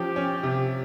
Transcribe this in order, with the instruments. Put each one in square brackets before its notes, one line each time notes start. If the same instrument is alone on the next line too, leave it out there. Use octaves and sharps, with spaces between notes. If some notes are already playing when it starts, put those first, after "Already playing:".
Already playing: [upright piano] F3 C#4 [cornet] G4
[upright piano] C#4
C3